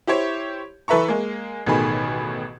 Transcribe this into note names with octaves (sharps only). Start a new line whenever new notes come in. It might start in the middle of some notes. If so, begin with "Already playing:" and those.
E4 G4 C5 C#5
E3 A4 B4 E5 A#5 C#6
G#3 A#3
A1 B2 D#3 A3 G#4 B5